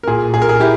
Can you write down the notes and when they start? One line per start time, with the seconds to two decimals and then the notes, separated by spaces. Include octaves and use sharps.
0.03 A#4
0.07 A#2 G#4
0.33 A#2 G#4
0.42 A#4
0.49 G#4
0.60 E4 G4